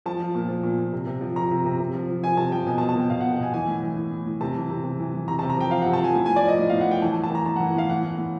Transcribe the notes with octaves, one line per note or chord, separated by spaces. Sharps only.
F3 A5
F3
A#2
F3
A#2
A#2
C3
C3
F3
F3 A#5
C3
C3
C3
F3
F3
F3 G#5
C3 A5
F3 G5
B2 G#5
A5
B2
A5
B2 G5
B2 F5
F#5
B2
G5
B2 G#5
E3 G#5
A2
E3
A2
A2
A2
C3 A5
E3
C3
C3
E3
E3
C3 A#5
A5
C3
A#5
F3 G5
F3 F5
F#5
C3
A5
F3 G#5
A2 G#5
G#5
A2
D5
F3 D#5
A2
F5
A2
F#5
A2 G5
E3 A5
A5
A2
A5
E3 A#5
A2 A5
F#5
E3
F#5
A2 F5
E3 F#5
A2
A2